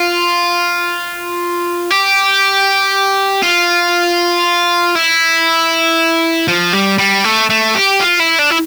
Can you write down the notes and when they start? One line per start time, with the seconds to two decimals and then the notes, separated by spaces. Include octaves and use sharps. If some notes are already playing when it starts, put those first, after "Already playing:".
Already playing: F4
1.91 G4
3.43 F4
4.95 E4
6.48 F3
6.73 G3
6.99 G3
7.25 A3
7.50 A3
7.75 G4
8.00 F4
8.19 E4
8.39 D4
8.50 E4